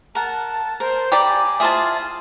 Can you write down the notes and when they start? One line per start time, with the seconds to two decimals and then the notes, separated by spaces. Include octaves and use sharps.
0.15 A#4 F#5 A5
0.80 A#4 C5
1.12 G3 G4 D5 G5 A#5
1.29 G#5
1.60 E4 F4 G#4 C5 A5